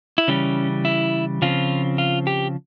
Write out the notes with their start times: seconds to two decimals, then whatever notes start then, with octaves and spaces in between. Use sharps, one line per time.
0.18 E4
0.28 C#3 E3 G3 C#4
0.85 E4
1.42 C#3 F3 C4 F4
1.98 F4
2.27 G4